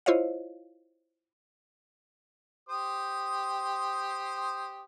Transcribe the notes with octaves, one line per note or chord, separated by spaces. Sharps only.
E4 F4 C5 C#5 D#5 F5
G4 C5 D#6